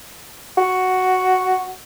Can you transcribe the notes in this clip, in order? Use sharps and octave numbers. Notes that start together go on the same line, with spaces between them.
F#4